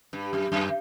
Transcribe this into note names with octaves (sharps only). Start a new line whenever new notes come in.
G2
F#2
F#2